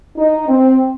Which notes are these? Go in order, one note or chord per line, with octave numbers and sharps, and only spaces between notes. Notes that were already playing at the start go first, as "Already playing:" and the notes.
D#4
C4